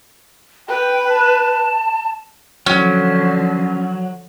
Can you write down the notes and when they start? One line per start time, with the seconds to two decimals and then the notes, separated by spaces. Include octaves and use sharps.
0.68 B4 G5
1.09 A5
2.66 D3 F3 F#3 C#4